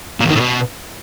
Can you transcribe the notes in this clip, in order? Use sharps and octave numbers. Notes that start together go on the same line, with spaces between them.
A#2
E2
D#3
A2
B2